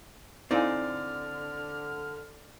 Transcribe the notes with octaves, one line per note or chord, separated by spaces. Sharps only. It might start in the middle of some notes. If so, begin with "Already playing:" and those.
D3 C4 D#4 E4 D5 F5 G#5 F6